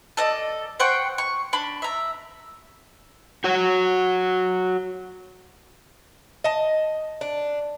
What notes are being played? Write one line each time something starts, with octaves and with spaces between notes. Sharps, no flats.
A4 D5 D#5
C5 F#5 G5 C#6
C#6
D4 B5
E5 A#5
F#4 C#5
D#5 A5
D4